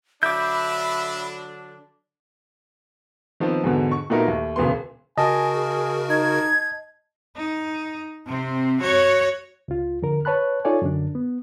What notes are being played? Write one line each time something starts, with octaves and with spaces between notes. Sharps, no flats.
D3 F#3 D4 E5 B5 D6 G6
D#3 F3 B3 C4
E2 G#2 B2 D3
C#6
A#2 A3 B3 D#4 F#4 A#4
D#2 A3
E1 D2 C#3 E3 B3 C6
C#3 F#4 A#4 D#5 G#5 A5
G#4
D#4 G#6
D#4
C3 C4
F#4 C#5
C#2 F4
F2 D3 A#4
B4 C#5 A5 B5 F#6
D#4 F4 A4 C#5 D5 G#5
F#2 D3 D4
B3